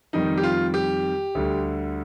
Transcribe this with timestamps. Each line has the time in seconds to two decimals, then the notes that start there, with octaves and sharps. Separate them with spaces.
0.13 F2 D#3 G3 D#4
0.37 G4
0.43 F4
0.74 G4
1.35 D2 D3 G3